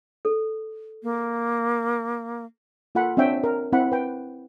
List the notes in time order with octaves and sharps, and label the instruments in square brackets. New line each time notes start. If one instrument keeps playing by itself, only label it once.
[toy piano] A4
[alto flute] A#3
[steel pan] A#3 F4 A4 F#5 B5
C4 D4 C#5 E5 G5 G#5
A#4
C4 E4 F#5 B5
B4 G5